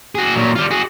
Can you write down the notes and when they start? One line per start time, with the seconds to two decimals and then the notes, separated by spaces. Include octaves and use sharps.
0.15 F#4 G#4
0.35 A#2 F#3
0.56 G3 F4
0.71 F#4 G#4